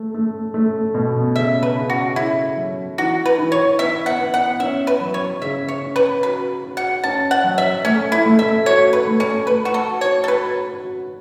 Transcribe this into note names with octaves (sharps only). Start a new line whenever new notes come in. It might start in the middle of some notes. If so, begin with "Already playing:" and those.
Already playing: A3
A3
A3
B2
C#3 E5
B4
C#3
F#4
C#3 E4
F#3
E3 F#4
B4
E3
C#5
B3 E5
F#5
B3
F#5
C#4 E5
B4
F#3
C#5
C#3 E5
C#5
C#4
B4
F#4 B4
F#4
F#5
C#4 A5
F#5
F#3
E5
A3 C#4
E4
A3
E5
F#4 C#5
B4
A3
C#4
A3 B4
F#4
A4
F#4
C#5
A4
F#4 B4
F#4